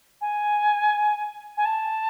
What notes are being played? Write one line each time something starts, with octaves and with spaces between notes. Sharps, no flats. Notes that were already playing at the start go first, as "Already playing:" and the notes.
G#5
G#5
A5